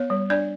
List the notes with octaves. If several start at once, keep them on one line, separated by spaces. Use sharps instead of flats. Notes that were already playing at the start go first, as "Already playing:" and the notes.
Already playing: B3 C#5
G3
D4 D5